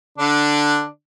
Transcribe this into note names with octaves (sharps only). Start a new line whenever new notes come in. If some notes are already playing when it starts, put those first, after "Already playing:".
D3 D4